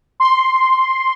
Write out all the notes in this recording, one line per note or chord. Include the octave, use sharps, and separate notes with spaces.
C6